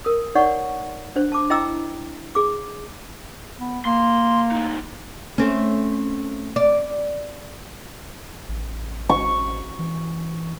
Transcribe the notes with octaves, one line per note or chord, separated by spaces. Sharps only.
A#4 D#6
D#4 C#5 D5 F#5 C#6
D4 C5
A5 D6
E4 D#5 G5 A#5 D6 E6
G#4 D6
B3
A#3 C6
A2 D#4
A3 C4 C#4
D5
A1
C#6
E3